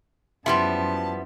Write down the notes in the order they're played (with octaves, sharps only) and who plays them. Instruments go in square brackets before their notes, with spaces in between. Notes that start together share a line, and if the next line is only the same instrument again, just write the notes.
[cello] F#2 [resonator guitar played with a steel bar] F3 G3 B3 [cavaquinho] E4 C5 [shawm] A5